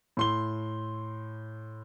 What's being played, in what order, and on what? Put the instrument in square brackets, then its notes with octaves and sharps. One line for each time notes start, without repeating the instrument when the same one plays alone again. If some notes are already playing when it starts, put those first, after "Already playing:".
[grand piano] A2 C6 G7